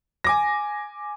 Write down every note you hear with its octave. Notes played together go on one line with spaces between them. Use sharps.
G#5 D6 A#6